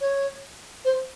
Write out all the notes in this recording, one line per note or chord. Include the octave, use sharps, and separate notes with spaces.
C#5
C5